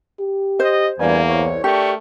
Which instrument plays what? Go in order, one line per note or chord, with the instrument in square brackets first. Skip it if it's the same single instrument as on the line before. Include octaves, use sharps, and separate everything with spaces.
[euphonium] G4
[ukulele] C5 [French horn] D#5
[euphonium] E2 [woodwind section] G2 G3 G#5 [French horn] A#3
[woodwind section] C2 C#5
[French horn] A3 [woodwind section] D4 A#4 C#6 [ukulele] G4